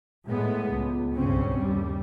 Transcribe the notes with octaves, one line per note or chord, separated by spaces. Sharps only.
A2 G#3 B3
C#2
B1 G2 C#3 C4 C#4
D#2 G3